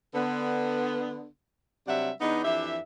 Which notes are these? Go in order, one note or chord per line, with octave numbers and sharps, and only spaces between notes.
D3 B3
C3 F#3 G3 D4 E5 F#5
E2 B3 D4 D#4
F2 E3 D4 G4 E5